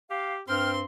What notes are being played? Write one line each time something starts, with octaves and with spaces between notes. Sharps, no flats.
G4 F5
G2 C4 G5 C6 F6